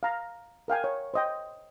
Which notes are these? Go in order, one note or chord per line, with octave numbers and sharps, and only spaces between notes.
F5 A#5
A#4 F5 G5 G#5
C#5
C5 D#5 G5